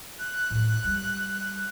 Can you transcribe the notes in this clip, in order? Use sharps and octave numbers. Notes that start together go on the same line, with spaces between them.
F#6
A2
G3